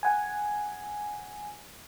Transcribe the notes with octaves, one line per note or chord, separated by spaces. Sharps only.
F#5 G#5